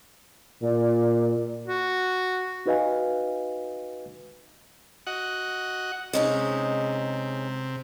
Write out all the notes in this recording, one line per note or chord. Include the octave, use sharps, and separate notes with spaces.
A#2 D5
F#4
D#4 F#4 B4 D#5 F5 G#5
F#4 D#5 F#5
C3 G#3 C#4 D#4